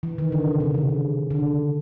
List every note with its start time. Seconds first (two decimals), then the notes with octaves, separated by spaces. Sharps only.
0.03 E3
0.18 D#3
0.32 D3
0.46 C#3
0.60 C3
0.74 C#3
1.31 D3